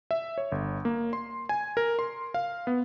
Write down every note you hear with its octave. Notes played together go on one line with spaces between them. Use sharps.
E5
C#5
G1
A#3
C6
G#5
A#4
C6
F5
B3